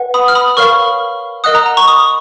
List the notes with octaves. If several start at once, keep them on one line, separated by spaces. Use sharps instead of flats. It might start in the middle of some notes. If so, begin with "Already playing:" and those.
Already playing: B4 F#5
B5 D#6
F6
B5 D#6
A#4 C#5 F5 C#6 F6
A#4 D#5 F#5 D#6 F#6
A#5
A#5
A#5 C#6
B5 D#6